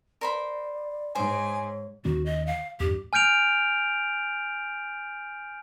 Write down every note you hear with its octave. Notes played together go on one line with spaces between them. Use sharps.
A#4 C5 D5 B5
G#2 C5 C#5 G#5
D#2 D#3 C#4 F#4
D#5
F5
E2 G2 G4
G#5 F6 G6 D7 F7